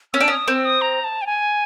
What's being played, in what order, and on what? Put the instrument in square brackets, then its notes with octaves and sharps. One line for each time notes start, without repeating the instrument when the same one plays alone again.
[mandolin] C#4 [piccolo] E6
[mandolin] D4
C#4
[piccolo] D#6
[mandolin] C4 [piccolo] E6
[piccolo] D#6
A#5
A5
G5
G#5